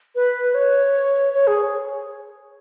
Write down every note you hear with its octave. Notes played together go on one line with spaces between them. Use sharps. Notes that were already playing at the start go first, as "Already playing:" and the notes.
B4
C#5
C#5
G#4